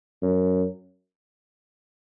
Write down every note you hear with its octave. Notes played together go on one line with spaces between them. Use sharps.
F#2